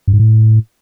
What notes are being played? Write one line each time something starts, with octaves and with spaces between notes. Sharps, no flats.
G2
G#2
A2